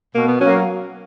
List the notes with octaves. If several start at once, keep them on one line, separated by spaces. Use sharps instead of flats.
B2 A#3
B3
F#3 A#3 C#4